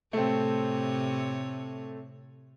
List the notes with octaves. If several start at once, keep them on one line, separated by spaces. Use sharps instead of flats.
A2 C3 A3 C4 C#5